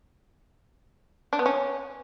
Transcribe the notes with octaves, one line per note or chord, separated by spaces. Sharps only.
D4
B3
C#4